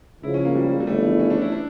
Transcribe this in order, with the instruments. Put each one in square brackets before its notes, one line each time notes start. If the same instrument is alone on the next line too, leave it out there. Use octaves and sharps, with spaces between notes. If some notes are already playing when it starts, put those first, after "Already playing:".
[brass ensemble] C#2 C#3 F3 [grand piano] E4
[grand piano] C#4
A#3
G3
G3
[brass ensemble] G1 F2 C#3 E3 [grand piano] A3
[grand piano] C#4
D4
E4
D4